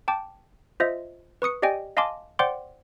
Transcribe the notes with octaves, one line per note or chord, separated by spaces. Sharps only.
G5 A5 D6
F4 C5 D#5 E5
B4 C#6 D#6 C#7
G4 D5 D#5 G5 G#5
D#5 F5 G#5 A5 C6 D6
C5 D5 F#5 G5 C6 D6